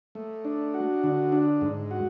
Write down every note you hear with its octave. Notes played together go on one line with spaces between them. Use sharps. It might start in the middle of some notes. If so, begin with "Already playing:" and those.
A3
D4
F#4
D3
D4
G#2
F#4